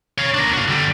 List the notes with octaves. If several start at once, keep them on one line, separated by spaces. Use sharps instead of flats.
C#5 F5
D4 A#4
F#4 F5
D3 G3